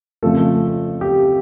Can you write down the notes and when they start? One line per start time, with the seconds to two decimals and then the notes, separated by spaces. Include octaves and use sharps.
0.23 F2 C#3 F3 A3 A4
1.01 G4